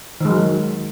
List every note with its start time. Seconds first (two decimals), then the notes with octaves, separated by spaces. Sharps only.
0.20 D#3
0.25 G#3
0.30 F#3